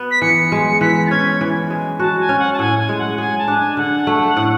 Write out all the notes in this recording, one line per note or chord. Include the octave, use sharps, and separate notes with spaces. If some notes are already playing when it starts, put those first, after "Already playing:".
Already playing: B3
B6
E3 C#7
G#3
E3 B6
A6
C#4 G#6
E3
G#3
F#4 A5
G#5
C#4
F#5
A5
A2 G#5
G#5
G#3
F#5
G#4 G#5
A5
D4
G#5
D3 F#5
A3
A2